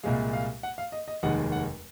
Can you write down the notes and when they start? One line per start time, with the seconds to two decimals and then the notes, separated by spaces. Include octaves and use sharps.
0.03 C2 A#2 G#3 F5
0.33 F5
0.63 F#5
0.78 F5
0.92 D#5
1.08 D#5
1.23 F1 D#2 D#3 G#3 F#5
1.52 F#5